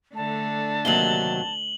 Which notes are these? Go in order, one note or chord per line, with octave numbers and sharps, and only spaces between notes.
D3 A3 D4 A5
D#2 C3 F#3 F#7 G7